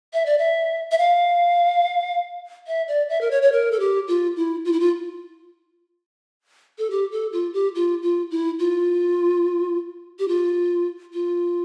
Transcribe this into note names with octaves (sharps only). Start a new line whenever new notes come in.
E5
D5
E5
E5
F5
E5
D5
E5
A#4
C#5
C#5
A#4
A4
G4
F4
E4
F4
E4
F4
A4
G4
A4
F4
G4
F4
F4
E4
F4
G4
F4
F4